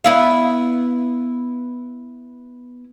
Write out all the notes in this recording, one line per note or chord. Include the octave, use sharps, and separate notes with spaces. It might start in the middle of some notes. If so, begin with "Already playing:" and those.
B3 E4 F5